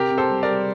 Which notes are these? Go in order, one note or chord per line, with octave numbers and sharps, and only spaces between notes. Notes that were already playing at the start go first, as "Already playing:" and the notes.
Already playing: C3 G4 A#4
C3
A4 C5
G3
A#4 D5
G3